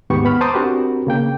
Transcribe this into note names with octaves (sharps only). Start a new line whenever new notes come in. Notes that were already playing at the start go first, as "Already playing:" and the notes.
D#2 G#2 B3 G4 C#6
B3 B5 F6
C5 A5 A#5 C6 D6 D#6
C4 D4 F#4 G4 A#4 B4
C#3 A#3 G5